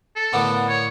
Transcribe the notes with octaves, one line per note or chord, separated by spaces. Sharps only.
A4
A2 D3 A#3 B3
C#5